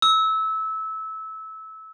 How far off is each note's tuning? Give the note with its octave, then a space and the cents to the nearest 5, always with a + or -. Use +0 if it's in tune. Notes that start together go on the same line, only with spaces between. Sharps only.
E6 -20